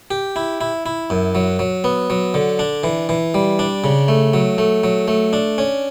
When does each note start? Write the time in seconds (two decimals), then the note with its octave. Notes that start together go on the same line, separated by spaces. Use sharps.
0.11 G4
0.36 E4
0.61 E4
0.86 E4
1.10 F#2
1.35 F#3
1.59 F#3
1.84 B3
2.10 F#3
2.34 D3
2.59 D4
2.84 E3
3.09 E3
3.34 G3
3.59 D4
3.84 C#3
4.08 A3
4.34 F#3
4.58 A3
4.84 F#3
5.08 A3
5.33 D4
5.58 C#4